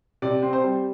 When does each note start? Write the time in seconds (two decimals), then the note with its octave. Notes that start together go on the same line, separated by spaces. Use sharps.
0.22 C3 D5
0.43 C4
0.53 C5
0.64 G3